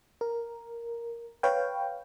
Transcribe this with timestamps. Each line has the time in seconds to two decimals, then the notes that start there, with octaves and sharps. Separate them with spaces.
0.21 A#4
1.43 B4 C#5 F5 G5